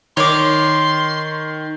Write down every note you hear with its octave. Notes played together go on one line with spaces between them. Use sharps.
D#3 C#5 C6 D6